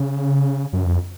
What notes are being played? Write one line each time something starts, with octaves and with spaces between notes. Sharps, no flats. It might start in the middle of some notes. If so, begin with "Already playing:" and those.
Already playing: C#3
F#2
F2